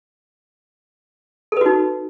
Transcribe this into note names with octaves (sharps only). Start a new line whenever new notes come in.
D#4 F#4 A4 B4